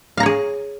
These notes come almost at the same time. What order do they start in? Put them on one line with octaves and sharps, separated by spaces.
F5 A#5 C#5 G#4